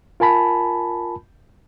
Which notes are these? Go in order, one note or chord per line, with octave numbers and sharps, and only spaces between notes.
F4 A#4 G#5 A5 B5